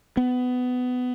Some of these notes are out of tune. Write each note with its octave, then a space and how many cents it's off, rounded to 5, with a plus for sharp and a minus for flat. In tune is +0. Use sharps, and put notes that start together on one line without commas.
B3 +20